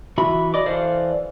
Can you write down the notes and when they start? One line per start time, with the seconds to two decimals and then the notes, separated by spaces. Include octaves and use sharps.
0.18 E3 F#4 E5 B5
0.54 D5 D#5 D6
0.66 E3 A4 C5 D5 F5